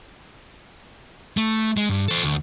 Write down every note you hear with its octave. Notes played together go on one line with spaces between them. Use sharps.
A3
G#3
G2
A4 C5
D2